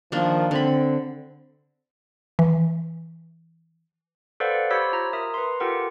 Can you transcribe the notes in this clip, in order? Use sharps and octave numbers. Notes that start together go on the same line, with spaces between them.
D#3 F3 A#3 D4
D3 C4 B5
E3
A4 B4 C5 D5 F5 F#5
G4 C5 C#5 B5 E6 B6
F4 A#5 B6
A#4 E5 A#5 D#6
B4 C6
F4 G4 A4 A#4 F#5 G5